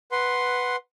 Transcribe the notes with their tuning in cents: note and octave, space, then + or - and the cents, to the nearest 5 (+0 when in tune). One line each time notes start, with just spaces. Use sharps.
B4 +0 F#5 +0 C6 +0